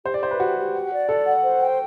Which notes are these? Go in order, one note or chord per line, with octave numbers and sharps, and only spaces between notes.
G4 C5
D5
C5 E5
B4
F#4 G4
G4
F#5
D5
A4 B5
F#5
C5
G5